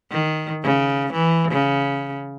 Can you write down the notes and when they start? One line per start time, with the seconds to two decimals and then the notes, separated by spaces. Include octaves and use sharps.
0.11 D#3
0.63 C#3
1.13 E3
1.51 C#3